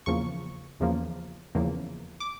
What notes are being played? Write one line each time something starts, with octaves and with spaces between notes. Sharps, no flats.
E2 C#3 F3 A#3 C#6
E2 C#3 F3 A#3
E2 C#3 F3 A#3
D6